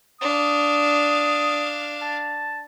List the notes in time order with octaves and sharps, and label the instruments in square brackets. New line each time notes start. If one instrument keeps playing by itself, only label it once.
[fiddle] D4 F5 [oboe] D#6
[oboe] A5